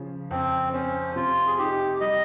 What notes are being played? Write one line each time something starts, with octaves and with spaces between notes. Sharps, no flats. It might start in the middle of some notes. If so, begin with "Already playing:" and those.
Already playing: C#3 F3
F2 C4
C4 C#4
C3 F4
G#4
D#4 G4
G3 D#5